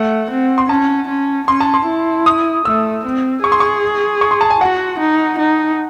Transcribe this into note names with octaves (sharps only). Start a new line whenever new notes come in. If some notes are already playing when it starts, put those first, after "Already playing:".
Already playing: A3 F#5
C4
C6
C#4 A5
C#4
C#4 C6
A5
C6
E4
D#6
A3 E6
C4
G#4 C#6
C6
C#6
C#6
C6
A5
G#5
F#4 F#5
D#4
D#4